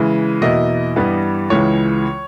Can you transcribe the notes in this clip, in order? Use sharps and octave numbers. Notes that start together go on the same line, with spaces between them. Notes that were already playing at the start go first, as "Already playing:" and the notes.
Already playing: C#3 E3 G#3
E2 B2 A#3 E4 D#5
G2 E3 G3 B3
C#2 C#3 E3 G#3 C#5